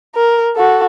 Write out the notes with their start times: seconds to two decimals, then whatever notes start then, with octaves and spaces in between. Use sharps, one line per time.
0.15 A#4
0.56 F#4 A4